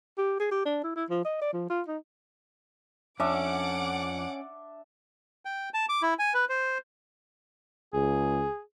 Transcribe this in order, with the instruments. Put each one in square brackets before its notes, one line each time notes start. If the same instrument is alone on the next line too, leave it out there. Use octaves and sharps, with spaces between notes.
[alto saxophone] G4
G#4
G4
D4
E4
E4
F3
D#5
D5
F3
F4
D#4
[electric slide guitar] F2 [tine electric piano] C#4 [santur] D4 E5 [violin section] F#5 D6
[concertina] G5
A5
D6
E4
G#5
B4
C5
[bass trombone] C#2 [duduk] G#4